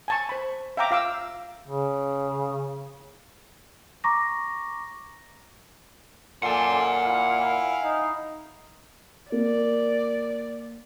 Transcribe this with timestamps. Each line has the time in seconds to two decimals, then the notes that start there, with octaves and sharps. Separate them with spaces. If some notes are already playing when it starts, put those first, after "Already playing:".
0.08 G#5 A5 C#6
0.29 C5 B5
0.77 E5 F5 G5 A#5 D6
0.91 F4 F5 D6 E6
1.66 C#3
4.04 A#5 C#6 D6 A#6
6.43 A#2 A4 D5 F#5 G#5 C6
7.04 E4 F5
7.83 D#4
9.32 A#3 D5